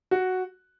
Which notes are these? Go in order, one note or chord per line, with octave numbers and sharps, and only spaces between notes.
F#4